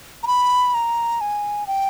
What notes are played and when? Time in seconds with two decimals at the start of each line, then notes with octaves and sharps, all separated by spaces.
0.23 A#5
0.27 B5
0.74 A#5
1.21 G#5
1.67 G5